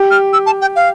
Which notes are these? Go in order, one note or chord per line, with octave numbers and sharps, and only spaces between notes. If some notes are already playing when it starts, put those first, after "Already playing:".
Already playing: G4
F6
E6
A5
G5
F5